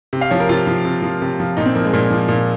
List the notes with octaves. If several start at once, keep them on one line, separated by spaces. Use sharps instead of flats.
C3
F5
F3 C#5
A#4
C3 F4
F3
C3
F3
C3
F3
A#2 D#4
C4
F3 A#3
G#3
A#2 A#3
F3
A#2